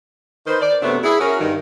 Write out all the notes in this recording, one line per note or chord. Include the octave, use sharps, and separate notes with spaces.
D#3 B4 C5
D5
F#2 C3 F#3 A3 B3 D4
E4 G#4
C#4 F#4 A#4
G2 D#3